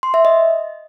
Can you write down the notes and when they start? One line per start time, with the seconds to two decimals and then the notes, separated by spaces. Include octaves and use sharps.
0.03 C6
0.14 E5
0.25 D#5